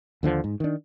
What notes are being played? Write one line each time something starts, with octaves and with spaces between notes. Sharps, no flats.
D#2 D3 D#3 F3
G#2
D#3 D4